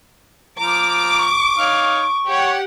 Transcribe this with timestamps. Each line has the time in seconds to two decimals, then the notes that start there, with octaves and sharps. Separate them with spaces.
0.59 F3 A#5 D6
1.18 C#6
1.58 D#4 C#5 F5
2.27 G4 C#5 F#5